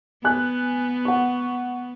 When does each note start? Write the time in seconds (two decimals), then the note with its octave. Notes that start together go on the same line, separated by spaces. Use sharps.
0.24 B3 G#5 F#6
1.05 F#5 C#6